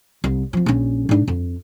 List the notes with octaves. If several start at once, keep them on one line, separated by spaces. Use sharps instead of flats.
C2
F3 C4
A#1 C#4
G#2 D4
F2